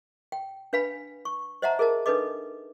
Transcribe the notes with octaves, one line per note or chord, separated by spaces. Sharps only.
G5
D4 B4 F5 G#5 B5
C#6
C5 D#5 E5 F#5 A5 A#5
G#4 A#4 D#5 A5
D4 D#4 A4 B4 D#5 D6